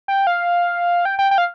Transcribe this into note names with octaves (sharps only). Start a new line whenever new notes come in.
G5
F5
G5
G5
G5
F5